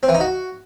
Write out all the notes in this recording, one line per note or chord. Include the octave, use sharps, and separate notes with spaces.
C4
E3
D#4
F#4